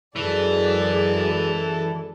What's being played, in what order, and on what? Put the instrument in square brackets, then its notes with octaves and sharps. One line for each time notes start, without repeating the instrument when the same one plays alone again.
[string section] F#2 G#3 D5 [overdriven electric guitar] E3 [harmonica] A4